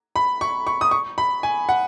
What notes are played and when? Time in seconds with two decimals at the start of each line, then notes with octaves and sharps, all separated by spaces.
0.16 B5
0.41 C#6
0.67 C#6
0.81 D#6
0.91 C#6
1.18 B5
1.43 G#5
1.69 F#5